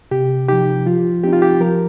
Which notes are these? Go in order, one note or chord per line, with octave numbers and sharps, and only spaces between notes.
C3 G4
F3 D#4 G4
F3 F4
C4 D#4 G4
F4
G4
F3 A#4